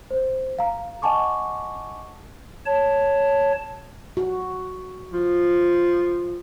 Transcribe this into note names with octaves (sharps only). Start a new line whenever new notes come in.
C5
F5 A#5
D#5 F#5 G#5 A5 C#6 D6
C#5 A5
F#4
F3